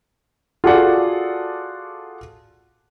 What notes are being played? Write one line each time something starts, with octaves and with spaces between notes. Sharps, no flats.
F4 F#4 G#4 A4 D5 F#5